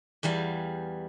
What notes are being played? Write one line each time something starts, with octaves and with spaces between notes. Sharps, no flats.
E2 E3 G3 F5